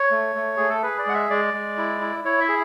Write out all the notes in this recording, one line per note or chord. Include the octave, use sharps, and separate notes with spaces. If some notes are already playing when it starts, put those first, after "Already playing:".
Already playing: C#5
A3
A3
A3 G#4
A4
G#4 B4
D5
G#3 F#5
E5
G#3 D5
G#3
E4
E4
E4 C#5
E5
G#4